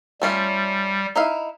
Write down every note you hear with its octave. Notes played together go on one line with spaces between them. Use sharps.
G3 A3 C#4 F4
D#4 E4 F5